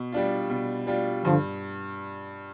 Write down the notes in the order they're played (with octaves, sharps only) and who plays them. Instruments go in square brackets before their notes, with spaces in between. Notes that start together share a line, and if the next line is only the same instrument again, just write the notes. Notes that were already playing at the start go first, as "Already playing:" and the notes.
Already playing: [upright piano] B2
G3 D4 F4
B2
G3 D4 F4
[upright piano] G2 [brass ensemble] D3 F3